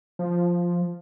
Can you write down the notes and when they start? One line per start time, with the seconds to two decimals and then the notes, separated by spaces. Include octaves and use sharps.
0.19 F3